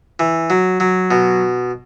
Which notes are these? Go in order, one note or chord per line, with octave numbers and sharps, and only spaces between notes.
E3
F#3
F#3
B2